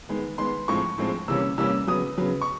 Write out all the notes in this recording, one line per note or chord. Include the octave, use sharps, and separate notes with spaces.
D#3 G#3 B3
D#3 G#3 B3 C6
A2 F3 G#3 C4 C#6
A2 F3 G#3 C4
C3 E3 G3 A#3 C#4 E6
C3 E3 G3 A#3 C#4 E6
C#3 F#3 B3 D#6
C#3 F#3 B3
C#6